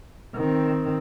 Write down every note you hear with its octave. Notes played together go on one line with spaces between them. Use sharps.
D#3 C4